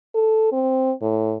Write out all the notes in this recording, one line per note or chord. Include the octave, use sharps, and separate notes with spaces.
A4
C4
A2